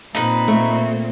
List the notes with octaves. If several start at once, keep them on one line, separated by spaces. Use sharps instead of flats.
A#2 C4 D#4 B4
A3